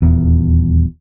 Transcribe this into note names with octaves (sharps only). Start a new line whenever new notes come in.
D#1 E2